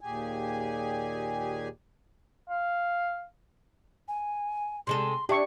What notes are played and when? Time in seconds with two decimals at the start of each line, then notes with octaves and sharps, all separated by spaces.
0.01 D#2 A#2 G4 G#4 G#5
2.49 F5
4.08 G#5
4.87 C3 G#3 A4 C6
5.29 D4 G4 E5 A5 C#6